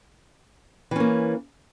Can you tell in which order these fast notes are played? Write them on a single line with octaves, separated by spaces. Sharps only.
E3 C#4 A#3